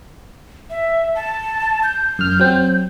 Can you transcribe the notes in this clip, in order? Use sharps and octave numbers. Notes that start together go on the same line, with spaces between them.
E5
A5
G6
F#2 F6
F#3 C4